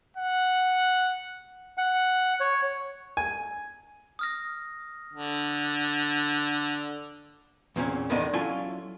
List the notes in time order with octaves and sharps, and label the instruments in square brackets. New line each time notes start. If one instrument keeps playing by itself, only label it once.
[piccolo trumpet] F#5
[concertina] F#5
C#5
[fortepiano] G#5
[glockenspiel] D#6 F6 A#6
[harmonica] D3
[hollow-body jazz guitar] E2 A#2 C4 C#4
E2 A2 D3 D#3 D4 D#5
F#3 C#4 E4 F4 A4 G#5